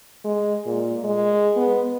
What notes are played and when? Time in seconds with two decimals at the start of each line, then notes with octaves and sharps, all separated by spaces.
0.25 G#3
0.66 A#2
1.04 G#3
1.56 B3